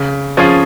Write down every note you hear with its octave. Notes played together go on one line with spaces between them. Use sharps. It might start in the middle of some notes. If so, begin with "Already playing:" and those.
Already playing: C#3
F3 C#4 F4 G#4